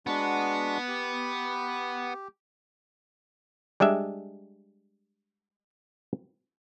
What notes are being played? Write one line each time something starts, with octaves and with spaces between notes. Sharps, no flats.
G#3 B3 D4 F#4
G4
G3 G#3 D4 E5